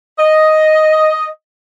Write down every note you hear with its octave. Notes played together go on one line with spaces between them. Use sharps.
D#5